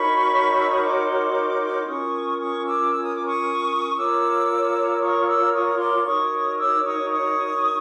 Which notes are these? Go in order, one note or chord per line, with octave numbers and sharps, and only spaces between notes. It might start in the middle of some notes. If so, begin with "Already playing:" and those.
Already playing: D#4 F#4 A#4 C#5 B5 C#6
E6
D#6
C6 D6
C#4 F4 A#4 C#6 D#6
C#6 D#6
D6 E6
E6
D#6
D6
C#6 D#6
F4 A#4 C#5 D6 E6
C#6 D#6
D6 E6
C#6 D#6
C6 D6
D#4 F#4 A#4 C#5 C#6 D#6
D6 E6
C#6 D#6
C#6 D#6